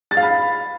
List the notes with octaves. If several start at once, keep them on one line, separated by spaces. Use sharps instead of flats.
A6
F5
B5